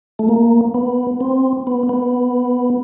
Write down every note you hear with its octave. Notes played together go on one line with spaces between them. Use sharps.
A3
A#3
B3
C4
B3
B3